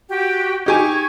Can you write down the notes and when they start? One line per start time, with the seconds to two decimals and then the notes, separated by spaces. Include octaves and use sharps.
0.09 F#4 G4 G5
0.66 D#4 G4 G#5 C#6 G#6